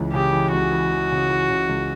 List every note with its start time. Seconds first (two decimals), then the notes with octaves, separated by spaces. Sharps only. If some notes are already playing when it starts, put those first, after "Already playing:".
Already playing: C#2 E3
0.13 C#3 G4
0.33 E3
0.52 C#2 F#4
0.72 E3
0.91 E3
1.11 C#3
1.30 E3
1.49 C#3
1.69 C#2